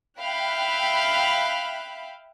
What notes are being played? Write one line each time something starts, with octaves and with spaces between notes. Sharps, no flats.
E5 F5 G5 B5 F#6